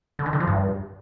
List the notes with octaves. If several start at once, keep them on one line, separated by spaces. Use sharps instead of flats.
D3
D#3
D3
F3
G2